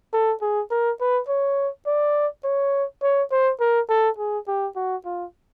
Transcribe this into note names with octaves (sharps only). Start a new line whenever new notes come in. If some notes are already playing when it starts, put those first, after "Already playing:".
A4
G#4
A#4
B4
C#5
D5
C#5
C#5
C5
A#4
A4
G#4
G4
F#4
F4